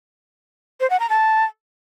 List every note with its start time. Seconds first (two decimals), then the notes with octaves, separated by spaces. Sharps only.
0.80 C5
0.90 F#5
1.00 A#5
1.09 A5